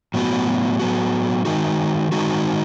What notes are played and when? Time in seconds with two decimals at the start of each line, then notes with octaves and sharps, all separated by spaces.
0.14 A2 F#3 B3 F#4
0.79 A2 F#3 B3 F#4
1.45 D#3 G#3 D#4 F#4
2.12 D#3 G#3 D#4 F#4